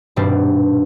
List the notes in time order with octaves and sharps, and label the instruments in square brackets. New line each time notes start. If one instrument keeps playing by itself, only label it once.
[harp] D#1 G2 B2 G3 C4 D4